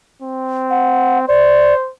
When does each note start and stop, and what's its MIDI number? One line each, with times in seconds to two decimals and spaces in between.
0.22 1.28 60
0.70 1.19 78
1.28 1.91 72
1.28 1.74 74